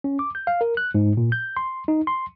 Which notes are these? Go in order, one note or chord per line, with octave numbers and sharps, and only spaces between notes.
C#4
D6
G6
F5
A#4
F#6
G#2
A#2
G6
C6
D#4
C6